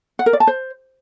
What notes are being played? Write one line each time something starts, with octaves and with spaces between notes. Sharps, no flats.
F#5
A#4
D5
A5
C5